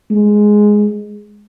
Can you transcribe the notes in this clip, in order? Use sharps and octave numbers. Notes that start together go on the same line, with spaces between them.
G#3